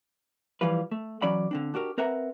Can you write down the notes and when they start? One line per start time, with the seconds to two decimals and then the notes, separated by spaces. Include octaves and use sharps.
0.61 E3 F3 G3 F4 B4
0.91 A3
1.22 E3 F#3 C#4 D5 B5
1.51 D3 C4 D4
1.74 D4 F#4 G4 A#4
1.98 C4 A#4 B4 E5 F#5 A#5